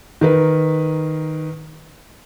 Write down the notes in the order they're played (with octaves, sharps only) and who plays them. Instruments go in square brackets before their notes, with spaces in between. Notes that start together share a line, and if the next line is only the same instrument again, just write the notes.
[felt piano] D#3 A#4 B4